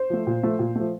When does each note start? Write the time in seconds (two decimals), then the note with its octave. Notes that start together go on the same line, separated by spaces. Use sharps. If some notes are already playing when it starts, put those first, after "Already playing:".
Already playing: C5
0.10 F3 A3
0.27 A#2
0.43 F3 A3
0.59 A#2
0.76 F3 A3